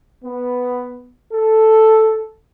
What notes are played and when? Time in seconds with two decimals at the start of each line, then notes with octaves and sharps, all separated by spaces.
0.24 B3
1.33 A4